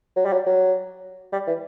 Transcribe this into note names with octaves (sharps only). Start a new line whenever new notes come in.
F#3
G3
F#3
F#3
G3
E3